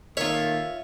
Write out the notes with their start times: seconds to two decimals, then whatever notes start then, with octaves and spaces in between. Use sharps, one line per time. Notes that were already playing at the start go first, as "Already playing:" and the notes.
0.17 A#2 D#3 A3 A#3 F4 C#5 E5